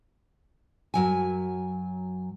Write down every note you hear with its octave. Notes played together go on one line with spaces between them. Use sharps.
F#2 F#3 G#5